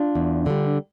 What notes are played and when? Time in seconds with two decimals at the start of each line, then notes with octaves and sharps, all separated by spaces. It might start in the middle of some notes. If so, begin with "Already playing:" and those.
Already playing: D4 F4
0.15 E2
0.46 D3 G3